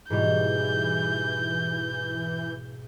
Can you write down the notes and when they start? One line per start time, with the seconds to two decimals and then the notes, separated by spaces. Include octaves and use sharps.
0.10 G#2 B2 E3 G3 G6